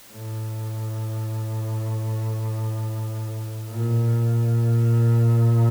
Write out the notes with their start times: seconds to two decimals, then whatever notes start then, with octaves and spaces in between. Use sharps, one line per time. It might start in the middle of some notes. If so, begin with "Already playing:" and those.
0.12 A2
3.71 A#2